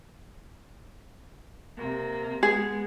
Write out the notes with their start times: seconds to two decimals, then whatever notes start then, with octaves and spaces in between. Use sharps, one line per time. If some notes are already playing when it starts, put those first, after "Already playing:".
1.77 C3 A#3
2.43 G#3 B3 G#4